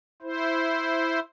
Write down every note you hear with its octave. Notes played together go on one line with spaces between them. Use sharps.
E4 C5